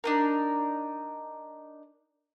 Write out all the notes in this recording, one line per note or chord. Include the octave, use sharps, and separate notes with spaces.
D4 D#4 A#4